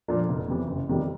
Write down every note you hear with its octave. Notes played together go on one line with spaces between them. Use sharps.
A#2 F3 A#3 D4
F1
E2 C3 E3
F#1
E2 C3 D#3 G3